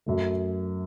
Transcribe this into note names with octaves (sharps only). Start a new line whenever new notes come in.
F#2 F#3 A3